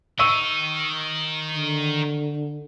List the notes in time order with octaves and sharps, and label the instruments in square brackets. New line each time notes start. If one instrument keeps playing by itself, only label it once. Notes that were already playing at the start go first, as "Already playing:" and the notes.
[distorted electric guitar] D#3 D#4 [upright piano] C#6 E6 D#7
[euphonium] D3